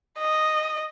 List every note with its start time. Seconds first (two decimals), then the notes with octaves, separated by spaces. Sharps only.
0.18 D#5